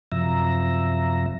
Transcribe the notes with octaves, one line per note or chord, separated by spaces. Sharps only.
F#2 C3 F3 E5 A#5